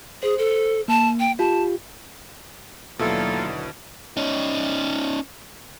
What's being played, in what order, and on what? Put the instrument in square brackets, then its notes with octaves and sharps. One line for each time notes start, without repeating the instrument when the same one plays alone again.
[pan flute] G#4 [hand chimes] C5
[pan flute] A4
[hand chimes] A#3 [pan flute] A5
[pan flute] G5
[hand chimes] F4 G4 [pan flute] A5
[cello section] D#2 D3 F#3 [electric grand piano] B2 E4 [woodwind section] A#3 F4 A4
[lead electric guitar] C#4 D#4